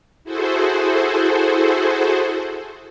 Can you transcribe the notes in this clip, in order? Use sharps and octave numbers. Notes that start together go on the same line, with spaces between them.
E4 F#4 G#4 A4 C5